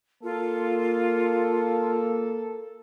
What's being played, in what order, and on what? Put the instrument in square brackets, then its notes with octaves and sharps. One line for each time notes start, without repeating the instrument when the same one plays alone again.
[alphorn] A#3 [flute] F4 [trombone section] A4